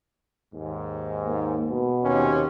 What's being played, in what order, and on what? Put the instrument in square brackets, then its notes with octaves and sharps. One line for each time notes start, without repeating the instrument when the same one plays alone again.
[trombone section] D#2 G#2
[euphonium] A#3
B2
[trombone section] D#2 C3 C#4